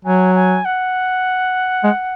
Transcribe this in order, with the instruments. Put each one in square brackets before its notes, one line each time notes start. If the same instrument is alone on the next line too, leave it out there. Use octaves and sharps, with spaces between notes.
[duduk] F#3 [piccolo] G#5
[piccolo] G#5
F#5
[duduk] G#3